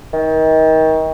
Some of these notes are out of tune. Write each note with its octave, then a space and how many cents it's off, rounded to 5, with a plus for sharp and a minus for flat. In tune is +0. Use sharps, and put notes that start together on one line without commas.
D#3 +30